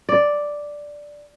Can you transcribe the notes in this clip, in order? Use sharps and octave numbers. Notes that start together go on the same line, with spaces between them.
D5